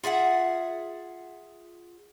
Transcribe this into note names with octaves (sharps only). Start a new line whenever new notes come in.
F4 G#4 E5 F#5